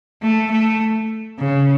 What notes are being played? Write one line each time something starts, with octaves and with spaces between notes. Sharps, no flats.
A3
A3
C#3